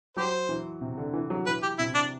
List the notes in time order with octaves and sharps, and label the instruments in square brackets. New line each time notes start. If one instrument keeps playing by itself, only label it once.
[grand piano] F#3 [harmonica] G4 C5
[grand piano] E3
C3
D3
E3
F#3
[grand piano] E3 [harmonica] B4
[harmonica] G4
[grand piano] C3 [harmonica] E4
[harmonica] D4